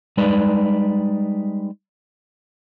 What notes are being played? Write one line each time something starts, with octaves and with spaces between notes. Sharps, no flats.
G3 G#3 D#4 B4 D5